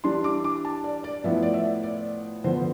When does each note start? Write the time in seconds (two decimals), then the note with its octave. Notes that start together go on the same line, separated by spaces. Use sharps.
0.04 E3 G3 D4 C6
0.24 D6
0.44 D6
0.65 A5
0.84 D5
1.04 D5
1.24 A2 F3 B3 E5
1.43 D5
1.54 E5
1.83 D5
2.44 D3 F3 B3 C5